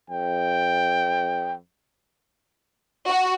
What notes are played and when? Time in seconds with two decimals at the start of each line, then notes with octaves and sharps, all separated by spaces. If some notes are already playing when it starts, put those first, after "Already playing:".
0.10 F2 G5
3.09 F#4